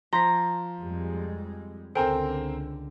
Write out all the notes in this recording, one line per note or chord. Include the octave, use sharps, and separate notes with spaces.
F3 A#5 C6 B6
F2 G3 G#3
C#2 D3 C4 A4 A#4 C5 G5 G#5